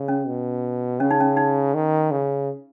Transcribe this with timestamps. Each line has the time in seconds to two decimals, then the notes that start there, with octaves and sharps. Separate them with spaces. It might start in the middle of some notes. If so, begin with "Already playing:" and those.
Already playing: C#3
0.08 C#4
0.27 B2
1.00 C#3 C#4
1.11 D#4
1.20 C#4
1.37 D#4
1.74 D#3
2.11 C#3